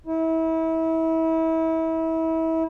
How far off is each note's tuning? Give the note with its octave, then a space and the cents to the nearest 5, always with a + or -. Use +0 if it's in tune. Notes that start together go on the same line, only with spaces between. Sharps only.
E4 -30